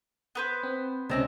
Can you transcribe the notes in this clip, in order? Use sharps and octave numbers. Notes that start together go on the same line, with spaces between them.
B3 B4 C5
C4
C#2 C3 C4 C#4 D#5 A#6